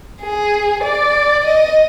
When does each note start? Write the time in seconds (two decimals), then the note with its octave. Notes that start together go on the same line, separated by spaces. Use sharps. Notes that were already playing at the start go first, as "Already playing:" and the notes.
0.22 G#4
0.83 D5
1.44 D#5